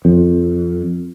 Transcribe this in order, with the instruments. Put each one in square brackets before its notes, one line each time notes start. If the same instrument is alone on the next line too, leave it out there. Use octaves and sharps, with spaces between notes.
[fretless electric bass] F2